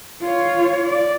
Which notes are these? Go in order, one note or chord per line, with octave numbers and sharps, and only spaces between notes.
F4 C#5
D5